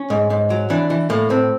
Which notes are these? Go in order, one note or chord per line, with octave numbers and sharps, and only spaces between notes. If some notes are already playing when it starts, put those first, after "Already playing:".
Already playing: C#4
G#2
G#2
F#3
E3 D4
E3
A2 A#3
A2 C4